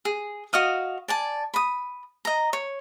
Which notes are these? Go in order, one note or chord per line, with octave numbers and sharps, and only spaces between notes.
G#4
F#4 D#5 F5 D#6
D5 G#5 A5
B5 D#6
D#5 A#5
C#5